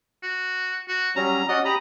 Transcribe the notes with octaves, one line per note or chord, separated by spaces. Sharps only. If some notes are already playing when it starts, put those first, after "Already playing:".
F#4
F#4
F#3 G3 C#4 A#5
C#4 F#4 D5 D#5
G4 A#5 B5 D#6